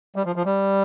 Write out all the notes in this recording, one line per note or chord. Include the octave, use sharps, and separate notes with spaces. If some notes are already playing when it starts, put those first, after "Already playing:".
G3
F3
F3
G3